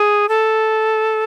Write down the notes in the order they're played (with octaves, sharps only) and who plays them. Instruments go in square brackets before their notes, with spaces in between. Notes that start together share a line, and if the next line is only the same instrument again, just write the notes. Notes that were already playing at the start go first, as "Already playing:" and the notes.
Already playing: [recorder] G#4
A4